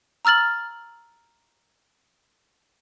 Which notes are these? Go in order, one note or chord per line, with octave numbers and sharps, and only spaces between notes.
A#5 E6 F6 A6 F#7